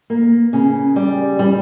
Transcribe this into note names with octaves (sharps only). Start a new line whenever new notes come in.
A#3
C#3
G3
G3